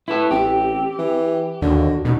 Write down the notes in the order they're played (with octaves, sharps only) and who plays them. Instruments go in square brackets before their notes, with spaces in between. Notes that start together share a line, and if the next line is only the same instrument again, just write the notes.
[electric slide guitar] E4 A4 [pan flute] B4
[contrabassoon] A1 [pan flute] C4 [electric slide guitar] G4
[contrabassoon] E3
[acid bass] D#2 [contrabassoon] D3 [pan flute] F#4
[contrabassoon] A1 [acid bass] B2 [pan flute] D#4